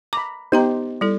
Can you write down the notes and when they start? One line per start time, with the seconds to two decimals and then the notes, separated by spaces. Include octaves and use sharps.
0.13 A#5 B5 D6
0.52 B3 D#4 G4 C5 G5 A#5
1.01 G3 E4 A4